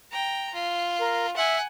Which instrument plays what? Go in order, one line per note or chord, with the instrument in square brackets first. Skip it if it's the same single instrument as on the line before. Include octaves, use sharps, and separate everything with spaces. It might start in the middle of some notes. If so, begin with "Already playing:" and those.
[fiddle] G5 A#5
F4
[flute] A#4
[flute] E5 [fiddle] F#5 G#5